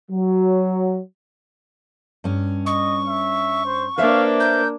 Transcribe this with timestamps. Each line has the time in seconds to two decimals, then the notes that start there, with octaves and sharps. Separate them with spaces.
0.11 F#3
2.24 G2 C#4
2.66 D#5 C#6
3.08 E5
3.66 C5
3.98 A#3 D4 B4 C5 E5 F5
4.40 A#4 G6